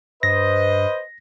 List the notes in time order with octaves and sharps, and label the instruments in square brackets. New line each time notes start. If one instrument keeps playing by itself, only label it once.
[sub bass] G2 [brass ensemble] B4 C5 D#5 [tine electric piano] A#6